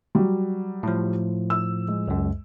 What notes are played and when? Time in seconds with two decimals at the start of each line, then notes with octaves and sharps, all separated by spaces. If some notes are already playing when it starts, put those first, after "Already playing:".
0.15 F#3 G3
0.83 A2 F3
1.50 E6
1.88 G#3
2.08 C#2 F#2